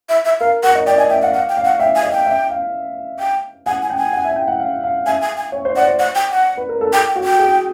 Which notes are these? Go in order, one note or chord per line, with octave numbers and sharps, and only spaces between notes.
E5
E5
A#4 F5
A#4 F#5
D#5
D5 G5
D#5 G#5
E5 G5
F5 F#5
F5 F#5
G5
F5
F#5
E5 G5
G#5
D#5
G5
E5
F5
G5
F#5 G#5
G#5
G5
G#5
F#5
E5
G5
F#5
F5
F5
E5 G#5
G#5
G#5
C#5
C5
D5 F#5
C5
F#5
G5
F#5
B4
A#4
A4
A4 G5
G5
F#4
G5
G#4